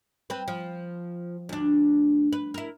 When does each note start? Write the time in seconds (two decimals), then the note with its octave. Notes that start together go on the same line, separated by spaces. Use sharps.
0.30 C4 B4
0.48 F3
1.49 D2 D4
2.33 B4
2.54 E4 A#4